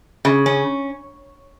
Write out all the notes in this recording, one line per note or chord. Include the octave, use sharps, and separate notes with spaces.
C#3
C#4